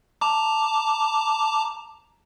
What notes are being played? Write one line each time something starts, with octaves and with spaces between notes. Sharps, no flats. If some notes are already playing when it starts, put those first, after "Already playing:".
A5 A#5 D6